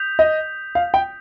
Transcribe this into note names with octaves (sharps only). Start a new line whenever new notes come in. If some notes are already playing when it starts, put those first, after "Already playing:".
Already playing: D#6 G6 B6 F7
D#5
F5
G5